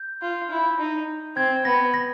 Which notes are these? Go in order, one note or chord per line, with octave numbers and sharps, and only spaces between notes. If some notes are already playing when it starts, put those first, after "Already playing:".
Already playing: G6
F4
E4
D#4
C4 G#6
B3 A#6
A#6